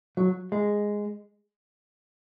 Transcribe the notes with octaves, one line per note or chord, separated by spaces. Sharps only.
F#3
G#3